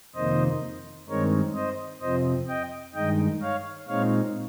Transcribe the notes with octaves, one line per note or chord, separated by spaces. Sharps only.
F2 C3 D#3 A#3 D#4 C5 D#5
G2 D#3 G#3 C4 D#4 A#4 C#5
C5 D#5
F2 C3 F3 C4 C5 D#5
D#5 G5
G2 D#3 G#3 D#4 D#5 G5
C#5 F5
A#2 G#3 C4 D#4 C#5 F5